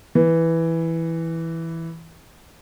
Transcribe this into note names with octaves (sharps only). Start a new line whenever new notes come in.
E3